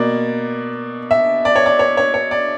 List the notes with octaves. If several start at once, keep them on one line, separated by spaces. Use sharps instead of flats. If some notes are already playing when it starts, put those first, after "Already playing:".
Already playing: B2 A#3 D5
E5
D5
C#5
D5
C#5
C#5
C#5
D5